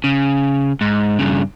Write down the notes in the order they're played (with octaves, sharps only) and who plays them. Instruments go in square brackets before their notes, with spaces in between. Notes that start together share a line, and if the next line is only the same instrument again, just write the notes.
[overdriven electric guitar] C#3
G#2
G2 C#3